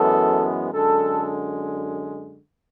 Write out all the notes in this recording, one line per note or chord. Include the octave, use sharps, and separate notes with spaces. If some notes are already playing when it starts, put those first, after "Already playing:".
Already playing: F#2 E3 G#3 B3 A4
F#2 D3 G#3 A4